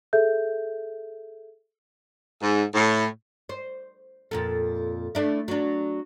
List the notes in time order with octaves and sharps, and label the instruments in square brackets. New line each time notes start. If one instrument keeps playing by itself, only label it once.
[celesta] G#4 A4 E5 G6
[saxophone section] G#2
A2
[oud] C5
F2 A#2 A4
A3 D4 E4
F#3 D4